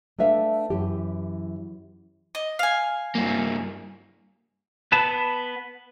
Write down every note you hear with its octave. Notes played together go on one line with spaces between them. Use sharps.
A3 D4 B4 E5 F5
F#2 E3 G4
D#5
F5 G#5
G2 A#3
B3 B4 A5